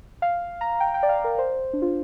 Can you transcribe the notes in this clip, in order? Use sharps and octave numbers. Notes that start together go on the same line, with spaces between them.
F5
A#5
G5
G5
D5
F5
A#4
C5
D4
F4